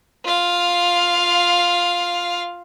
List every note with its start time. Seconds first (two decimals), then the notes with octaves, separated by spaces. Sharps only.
0.25 F4 F5